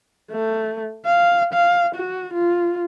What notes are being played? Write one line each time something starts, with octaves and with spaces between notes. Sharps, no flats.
A3
F5
F5
F#4
F4